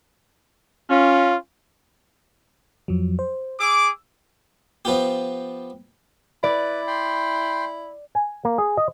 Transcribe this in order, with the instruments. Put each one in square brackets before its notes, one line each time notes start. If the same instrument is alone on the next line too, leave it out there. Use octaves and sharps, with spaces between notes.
[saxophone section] C#4 [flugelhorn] F4
[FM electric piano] F2 F3 F#3
C5
[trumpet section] G#4 D6 [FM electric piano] E6
[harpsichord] F3 B3 F4 G4
[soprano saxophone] E4 [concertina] B4 [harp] D5
[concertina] G5 B5 C6
[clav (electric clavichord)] G#5
A#3
G#4
D#5